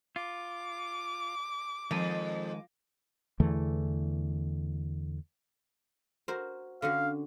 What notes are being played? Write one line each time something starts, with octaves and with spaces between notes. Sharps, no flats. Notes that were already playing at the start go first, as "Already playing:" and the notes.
F4 D6
F2 D#3 G#3 G#5
E2 D3 E3 A3
F#4 A#4 C5
D3 C#4 F#4 F5